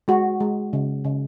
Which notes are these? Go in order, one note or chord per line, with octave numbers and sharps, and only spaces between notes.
G#3 F#4
G#3
C#3
C#3